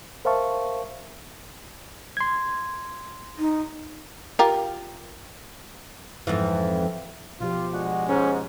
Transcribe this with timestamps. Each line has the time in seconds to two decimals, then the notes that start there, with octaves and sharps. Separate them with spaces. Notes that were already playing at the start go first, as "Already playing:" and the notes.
0.25 A#4 C5 E5 F5 A5 C#6
2.17 C6 G#6
3.39 D#4
4.39 F4 G4 A#4
6.27 F2 G#2 E3
7.40 B2 F3 F4 G4
7.73 G#3 D4 F#4 F#5
8.08 G#2 C#4